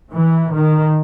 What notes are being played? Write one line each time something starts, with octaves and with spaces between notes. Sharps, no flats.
E3
D#3